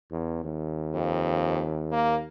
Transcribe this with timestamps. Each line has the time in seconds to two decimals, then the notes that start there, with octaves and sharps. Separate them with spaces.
0.11 E2
0.44 D#2
0.95 F2
1.92 A#3